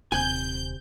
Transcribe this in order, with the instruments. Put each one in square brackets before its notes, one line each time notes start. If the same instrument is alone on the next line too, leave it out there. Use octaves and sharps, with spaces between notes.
[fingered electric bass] D#1 [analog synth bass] C3 [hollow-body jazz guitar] G#5 [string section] G6